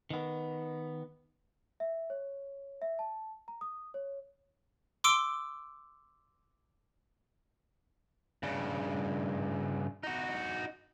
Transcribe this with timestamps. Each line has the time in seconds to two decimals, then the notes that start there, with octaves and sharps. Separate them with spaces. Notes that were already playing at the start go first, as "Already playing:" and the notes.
0.10 D#3 B3
1.80 E5
2.10 C#5
2.82 E5
2.99 A5
3.48 A#5
3.61 D#6
3.94 C#5
5.04 C6 D6 E6 D7 G7
8.43 G2 C#3
10.03 D#4 F#4